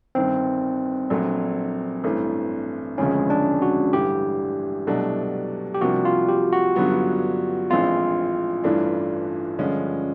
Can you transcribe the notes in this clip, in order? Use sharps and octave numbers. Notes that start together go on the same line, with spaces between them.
G1 G2 D#3 C4
A#1 A#2 F#3 A3
A1 G2 E3 A3
E1 D2 C#3 F3 G#3 C#4
D4
F#4
A1 G2 D3 G4
C2 B2 F#3 A3 D4
G4
C2 C3 F3 A#3 D4 F#4
F4
G4
F#4
G2 D3 F#3 B3
A#1 A2 E3 G#3 C4 F4
A1 G2 E3 A3 D4
G2 D3 F3 G#3 C#4